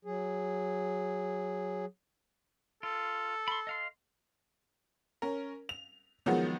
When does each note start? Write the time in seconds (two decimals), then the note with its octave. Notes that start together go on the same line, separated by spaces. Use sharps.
0.05 F#3 G#4
2.83 F4 A4
3.48 B5 C6
3.67 D#5 F5 C6
5.22 C#4 A#4
5.69 F7
6.26 D#3 F3 F#3 G#3 B3